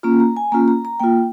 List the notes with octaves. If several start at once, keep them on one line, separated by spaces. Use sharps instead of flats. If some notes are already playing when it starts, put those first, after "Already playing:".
A#3 C#4 F4 A#5
A#5
G#5
A#3 C#4 F4 A#5
A#5
A#5
A#3 F4 G5